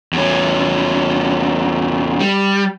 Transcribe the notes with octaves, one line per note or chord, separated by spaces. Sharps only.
E2 C#4
G3